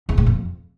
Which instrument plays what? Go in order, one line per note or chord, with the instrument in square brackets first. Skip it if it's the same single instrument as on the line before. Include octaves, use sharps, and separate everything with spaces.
[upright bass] E2
A2
F2